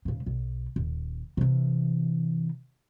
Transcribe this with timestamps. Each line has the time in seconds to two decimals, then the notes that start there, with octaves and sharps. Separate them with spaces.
0.05 D#1 C#3
0.26 B1
0.76 D#1
1.37 C3 E3